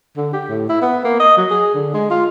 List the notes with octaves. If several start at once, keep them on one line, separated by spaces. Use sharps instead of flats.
D3
G4
A2
E4
B3
A#3
D#5
F#3
G#4
D3
G#3
F4